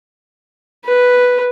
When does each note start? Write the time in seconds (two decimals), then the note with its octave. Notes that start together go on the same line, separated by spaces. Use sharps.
0.85 B4